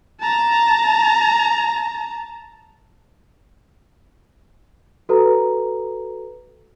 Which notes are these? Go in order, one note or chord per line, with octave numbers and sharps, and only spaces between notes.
A5 A#5
F#4 A4 B4 A#5